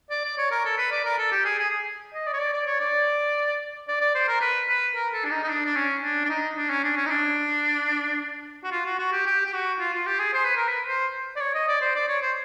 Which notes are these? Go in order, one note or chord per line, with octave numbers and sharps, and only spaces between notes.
D5
D5
C#5
A#4
A4
B4
D5
A#4
A4
G4
G#4
G#4
D#5
D5
C#5
D5
D5
C#5
D5
D5
D5
C5
A#4
B4
B4
A#4
A4
D4
D#4
D#4
D4
D4
C#4
D4
D4
D#4
D4
C#4
D4
C#4
D#4
D4
F#4
F4
F#4
F#4
G4
G4
G4
F#4
F4
F4
G4
G#4
C5
B4
A#4
B4
C5
D5
C#5
D#5
D5
C5
D5
C#5
C5